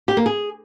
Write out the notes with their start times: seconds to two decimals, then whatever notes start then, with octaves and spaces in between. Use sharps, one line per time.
0.08 G4
0.17 A#3
0.26 G#4